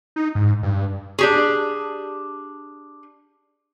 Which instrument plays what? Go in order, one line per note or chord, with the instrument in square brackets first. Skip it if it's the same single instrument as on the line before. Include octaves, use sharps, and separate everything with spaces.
[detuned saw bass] D#4
G#2
G2
[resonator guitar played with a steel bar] D4 G4 G#4